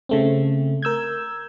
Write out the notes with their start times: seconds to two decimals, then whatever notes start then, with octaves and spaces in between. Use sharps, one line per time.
0.09 C#3 A3 C4
0.82 A#4 E6 G6 G#6